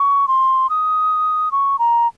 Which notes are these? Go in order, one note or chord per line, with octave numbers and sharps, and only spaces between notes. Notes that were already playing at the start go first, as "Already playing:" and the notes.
Already playing: C#6
C6
D#6
C#6
A#5